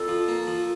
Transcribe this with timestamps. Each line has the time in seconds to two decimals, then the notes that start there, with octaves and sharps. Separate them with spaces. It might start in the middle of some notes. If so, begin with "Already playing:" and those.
Already playing: F2 A4
0.08 F3
0.28 A#3
0.47 F3